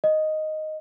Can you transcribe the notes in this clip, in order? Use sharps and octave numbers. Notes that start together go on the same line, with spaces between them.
D#5